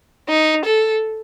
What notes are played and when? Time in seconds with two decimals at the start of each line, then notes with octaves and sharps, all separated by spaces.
0.29 D#4
0.65 A4